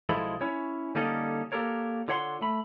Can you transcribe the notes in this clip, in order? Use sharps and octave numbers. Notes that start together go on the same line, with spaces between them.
B1 F3 G#3 E4 A4 B5
C#4 E4 C#5
D3 G3 A#3 C#4 D#4 A4
A#3 G4 A4 A#4 C#5
D3 F4 C#5 F#5 B5 C6
A3 B5